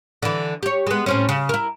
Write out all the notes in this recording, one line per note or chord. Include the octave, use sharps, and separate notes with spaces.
D3 E3
G4 C#5
G#3 B3
A2 C4 C#4
C#3
E4 A#4